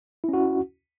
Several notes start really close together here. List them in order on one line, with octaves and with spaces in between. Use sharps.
E4 C#4 F#4